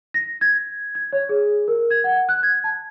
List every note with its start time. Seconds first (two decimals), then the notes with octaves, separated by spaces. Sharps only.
0.14 A#6
0.41 G#6
0.95 G#6
1.13 C#5
1.29 G#4
1.68 A#4
1.91 G#6
2.04 F#5
2.29 F#6
2.43 G#6
2.64 A5